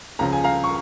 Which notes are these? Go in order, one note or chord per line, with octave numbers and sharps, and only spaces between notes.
C#2 C#3 F3 A#5
G#5
F5 A#5
C#6